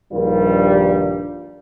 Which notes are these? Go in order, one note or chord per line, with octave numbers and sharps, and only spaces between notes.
A#1 G2 D#3 G3 F4 A#4